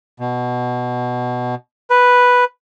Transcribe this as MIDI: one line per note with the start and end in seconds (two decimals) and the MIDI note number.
0.19 1.55 47
1.90 2.44 71